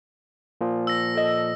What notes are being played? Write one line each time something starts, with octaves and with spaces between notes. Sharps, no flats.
A#2 F3
E6 A#6
A4 D#5